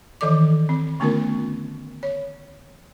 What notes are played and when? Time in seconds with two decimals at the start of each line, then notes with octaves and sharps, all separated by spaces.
0.21 D#3 E3 A4 D5 D6
0.69 C4
1.00 D3 A3 B3 C#4 F4 A#4
2.03 C#5